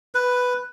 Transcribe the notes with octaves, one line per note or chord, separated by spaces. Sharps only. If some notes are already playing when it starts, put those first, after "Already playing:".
B4